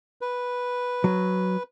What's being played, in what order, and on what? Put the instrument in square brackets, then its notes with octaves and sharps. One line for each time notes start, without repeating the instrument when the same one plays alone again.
[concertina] B4
[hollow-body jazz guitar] F#3